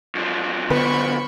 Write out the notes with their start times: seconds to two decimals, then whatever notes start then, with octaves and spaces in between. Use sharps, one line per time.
0.15 F#2 F3
0.70 D3 B3 B4 C5 B5 C#6